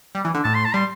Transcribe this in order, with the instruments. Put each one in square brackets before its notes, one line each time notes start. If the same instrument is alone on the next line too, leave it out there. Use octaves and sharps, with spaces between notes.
[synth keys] G3
E3
D3
[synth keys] A2 [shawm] A5
[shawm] C6
A5
[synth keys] G3 [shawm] C6